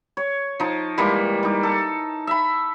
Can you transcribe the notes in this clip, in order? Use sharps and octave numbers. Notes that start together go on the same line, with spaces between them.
C#5
F3 D#4 A5
E3 G3 G#3 A#3
G3 D#4
A4
E5 B5